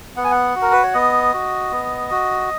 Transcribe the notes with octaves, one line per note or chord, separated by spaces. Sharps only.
B3 F#5
G#5
F#5
F#4
A#4
B4
C#5
B3 D#5
F#4
B3
F#4